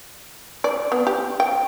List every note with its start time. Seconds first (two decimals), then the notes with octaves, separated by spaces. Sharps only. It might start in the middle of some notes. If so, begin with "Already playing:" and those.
0.64 D5
0.92 B3
1.07 G4
1.40 G5